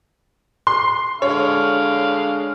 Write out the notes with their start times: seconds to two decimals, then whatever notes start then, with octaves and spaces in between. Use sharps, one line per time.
0.67 C6
1.22 D3 G#3 C#5 F5